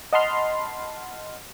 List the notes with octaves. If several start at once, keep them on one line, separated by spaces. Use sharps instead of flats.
D#5 F#5 A5 B5 C6 F6